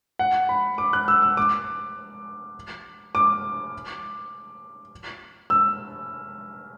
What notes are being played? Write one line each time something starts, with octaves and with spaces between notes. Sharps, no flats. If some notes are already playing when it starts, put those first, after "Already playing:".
F#5
B5
D6
F#6
E6
E6
D6
D6
E6